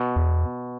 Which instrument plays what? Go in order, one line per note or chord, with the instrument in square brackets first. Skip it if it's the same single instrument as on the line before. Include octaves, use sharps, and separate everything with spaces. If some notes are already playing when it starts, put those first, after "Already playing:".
Already playing: [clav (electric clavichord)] B2
[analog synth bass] E2